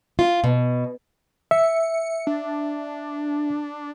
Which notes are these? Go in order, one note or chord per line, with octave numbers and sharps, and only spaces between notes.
F4
B2
E5 C#7
D4